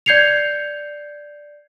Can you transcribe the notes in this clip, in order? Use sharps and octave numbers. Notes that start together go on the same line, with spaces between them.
D5 G6 G#6 C7 C#7 F7